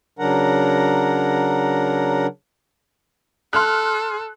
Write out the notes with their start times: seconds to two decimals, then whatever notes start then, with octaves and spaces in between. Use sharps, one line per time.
0.19 C#3 F#3 D4 A#4 F#5 A#5
3.53 A4 C6 F6 F#6